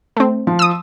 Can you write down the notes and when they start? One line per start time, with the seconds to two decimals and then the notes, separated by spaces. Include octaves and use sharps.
0.17 A3 C4
0.47 F3
0.59 D#6 E6